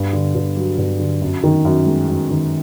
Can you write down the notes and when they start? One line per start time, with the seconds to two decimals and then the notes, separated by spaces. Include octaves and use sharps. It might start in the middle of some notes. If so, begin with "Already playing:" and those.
Already playing: G2
0.13 D3
0.35 G2
0.57 F#3
0.78 G2
0.99 D3
1.21 F#2
1.43 D#3
1.65 F#2
1.86 G#3
2.08 F#2
2.30 D#3